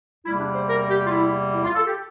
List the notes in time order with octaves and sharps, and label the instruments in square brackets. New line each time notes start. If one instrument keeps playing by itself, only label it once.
[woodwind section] E2 C3 G3 A#3 E4
D4
C5
A#4
G4
F4
E4
E4
F4
A4
G4